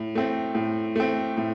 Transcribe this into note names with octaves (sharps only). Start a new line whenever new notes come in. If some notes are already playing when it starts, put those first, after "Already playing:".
Already playing: A2
A3 C4
A2
A3 C4
A2